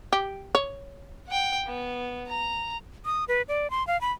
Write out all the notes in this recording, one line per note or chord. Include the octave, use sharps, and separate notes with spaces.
G4
C#5
F#5 G5
B3
A#5
D#6
B4
D5
C6
F5
B5